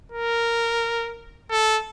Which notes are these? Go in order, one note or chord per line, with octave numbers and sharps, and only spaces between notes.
A#4
A4